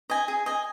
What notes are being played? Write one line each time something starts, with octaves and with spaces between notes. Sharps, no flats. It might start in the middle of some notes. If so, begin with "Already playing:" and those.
D#5 G#5
G#4
D#5 G#5